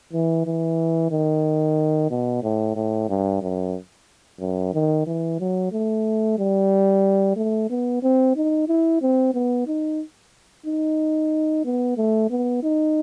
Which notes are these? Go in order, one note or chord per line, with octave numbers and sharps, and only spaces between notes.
E3
E3
D#3
B2
A2
A2
G2
F#2
F#2
D#3
E3
F#3
A3
G3
A3
B3
C4
D#4
E4
C4
B3
D#4
D#4
B3
A3
B3
D#4